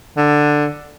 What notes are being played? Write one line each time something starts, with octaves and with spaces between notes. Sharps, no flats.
D3